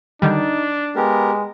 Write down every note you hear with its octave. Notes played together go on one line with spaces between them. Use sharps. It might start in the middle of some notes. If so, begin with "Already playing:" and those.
D3 D#3 G3 D4 D#4
G#3 B3 G4 A#4